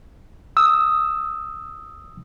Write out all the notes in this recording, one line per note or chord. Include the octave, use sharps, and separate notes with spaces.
D#6 E6